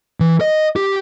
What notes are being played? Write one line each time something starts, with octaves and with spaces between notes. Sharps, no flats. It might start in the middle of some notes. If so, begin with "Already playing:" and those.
E3
D#5
G4